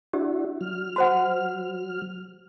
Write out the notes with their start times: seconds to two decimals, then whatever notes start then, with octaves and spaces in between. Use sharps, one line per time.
0.13 D4 E4 F#4 G4
0.61 F#3 F6
0.96 F#4 C5 F#5